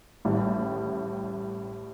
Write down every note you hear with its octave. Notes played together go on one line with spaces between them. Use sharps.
A1 A2 G3